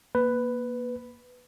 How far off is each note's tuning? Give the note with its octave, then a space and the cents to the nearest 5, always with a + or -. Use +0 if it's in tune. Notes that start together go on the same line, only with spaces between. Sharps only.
A#3 +25 B4 +5